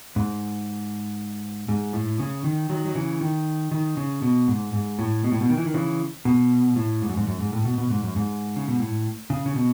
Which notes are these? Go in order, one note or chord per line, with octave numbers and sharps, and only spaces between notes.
G#2
G#2
A2
C#3
D#3
D#3 F#3
F#3
C#3 E3
D#3
D#3
C#3
B2
G#2
G#2
A2
B2
A2
B2
D#3
E3
D#3
C#3 E3
B2
A2
G#2
F#2
G#2
F#2
G#2
A2
B2
B2
G#2
F#2
G#2
C#3
B2
A2
C#3
C#3
B2